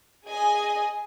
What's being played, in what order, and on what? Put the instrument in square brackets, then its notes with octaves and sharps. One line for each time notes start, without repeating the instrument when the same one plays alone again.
[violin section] G#4 D#5 G#5